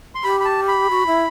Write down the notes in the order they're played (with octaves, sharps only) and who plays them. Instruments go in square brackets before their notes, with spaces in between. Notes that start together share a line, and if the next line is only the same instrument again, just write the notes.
[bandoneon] C6
[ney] G4 [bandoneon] B5
[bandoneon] B5
A5
B5
[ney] F#4
E4